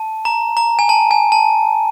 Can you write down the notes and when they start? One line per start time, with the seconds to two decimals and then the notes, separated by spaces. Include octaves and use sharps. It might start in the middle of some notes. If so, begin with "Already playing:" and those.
Already playing: A5
0.25 A#5
0.57 A#5
0.79 G#5
0.89 A5
1.11 G#5
1.32 A5